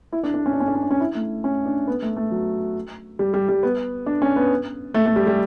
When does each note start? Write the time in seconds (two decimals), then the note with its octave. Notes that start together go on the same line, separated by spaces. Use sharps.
0.13 E4
0.23 D4
0.34 D4
0.46 C#4
0.53 D4
0.60 C#4
0.68 D4
0.75 C#4
0.83 D4
0.90 C#4
1.00 E4
1.15 A3
1.44 C#4
1.66 D4
1.88 B3
2.02 A3
2.17 A3
2.31 F#3
3.19 G3
3.34 G3
3.49 G3
3.63 B3
4.06 D4
4.22 C#4
4.36 B3
4.94 A3
5.06 A3
5.16 G3
5.27 G3